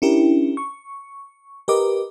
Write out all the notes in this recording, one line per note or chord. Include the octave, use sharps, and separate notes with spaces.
C#4 D4 E4 G4 A#4
C#6
G4 A#4 B4 D#5 D6